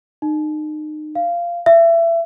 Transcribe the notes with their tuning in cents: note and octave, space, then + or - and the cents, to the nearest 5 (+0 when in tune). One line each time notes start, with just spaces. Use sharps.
D#4 -30
F5 -15
E5 +25